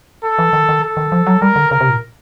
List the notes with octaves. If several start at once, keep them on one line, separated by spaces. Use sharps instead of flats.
A4
E3
D#3
D#3
A4
D#3
F3
F#3
G3 A#4
D3
C#3 A#4
C3
A#2